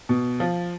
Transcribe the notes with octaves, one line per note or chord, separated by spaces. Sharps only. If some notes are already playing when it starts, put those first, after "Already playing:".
B2
F3